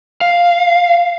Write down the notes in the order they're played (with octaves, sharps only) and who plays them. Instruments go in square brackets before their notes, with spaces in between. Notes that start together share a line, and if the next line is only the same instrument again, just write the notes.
[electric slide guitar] F5